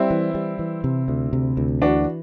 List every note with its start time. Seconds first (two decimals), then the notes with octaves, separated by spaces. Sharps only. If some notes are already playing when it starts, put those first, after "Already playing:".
Already playing: G3 C4 E4
0.10 E3
0.35 G3
0.59 E3
0.84 C3
1.08 D2
1.33 C3
1.57 D2
1.82 E3 D4 F#4